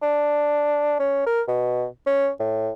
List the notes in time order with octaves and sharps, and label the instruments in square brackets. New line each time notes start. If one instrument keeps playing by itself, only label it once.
[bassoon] D4
C#4
A#4
B2
C#4
A2